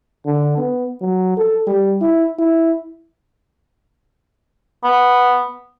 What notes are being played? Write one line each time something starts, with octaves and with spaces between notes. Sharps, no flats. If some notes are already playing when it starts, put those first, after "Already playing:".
D3
B3
F#3
A4
G3
E4
E4
B3